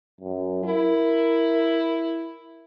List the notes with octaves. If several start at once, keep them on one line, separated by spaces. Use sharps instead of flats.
F#2
E4 A#4